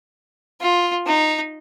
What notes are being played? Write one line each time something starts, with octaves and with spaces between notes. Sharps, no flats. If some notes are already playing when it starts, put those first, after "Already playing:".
F4
D#4